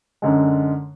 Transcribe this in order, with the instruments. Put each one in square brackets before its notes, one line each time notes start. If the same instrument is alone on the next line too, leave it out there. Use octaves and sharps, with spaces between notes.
[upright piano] F#2 D3 G#3